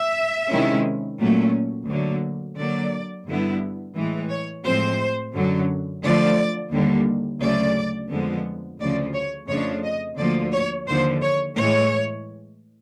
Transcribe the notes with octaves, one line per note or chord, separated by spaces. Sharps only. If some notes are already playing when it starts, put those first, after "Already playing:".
Already playing: E5
C3 D#3 G#3 C#4 E4
A#2 F#3 A3 C#4
D2 D3 F#3 A#3
D3 F#3 A#3 D5
G2 D3 G3 B3 E4
A2 E3 G#3
C#5
A2 F3 G#3 C4 C5
F#2 D3 F#3
D3 F3 A3 D5
D#2 D3 G3 A#3
D2 C#3 F#3 A3 D5
F2 D3 F3 G#3 B3
D2 C#3 F3 D5
C#5
F2 C#3 F3 A3 D4 C#5
D#5
D2 D3 F3 A#3 D5
C#5
D#2 D3 F3 C5
C#5
A2 E3 G#3 C#5